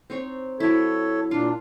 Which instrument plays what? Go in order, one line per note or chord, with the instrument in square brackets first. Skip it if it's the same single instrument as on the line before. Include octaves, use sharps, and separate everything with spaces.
[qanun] C4 D#4 C#5
[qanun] F#3 E4 [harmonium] A4 C#5
[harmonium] A#2 D4 [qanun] F4